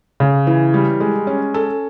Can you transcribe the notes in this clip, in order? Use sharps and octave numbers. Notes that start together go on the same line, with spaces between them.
C#3
E3
G3
G#3
C#4
A4